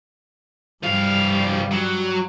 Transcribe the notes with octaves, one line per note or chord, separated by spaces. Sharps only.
C2 G2 G3 F5
F#3